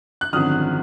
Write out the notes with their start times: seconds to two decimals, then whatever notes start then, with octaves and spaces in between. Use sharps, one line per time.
0.21 F#6
0.33 G#1 F#2 D3 F3 D#6 F6